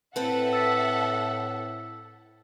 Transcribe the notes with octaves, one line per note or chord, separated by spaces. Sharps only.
A2 C4 A4 B4 E5 F#5
E6 A6 B6